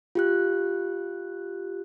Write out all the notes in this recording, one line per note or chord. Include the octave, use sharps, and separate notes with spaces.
F4 G4 F#6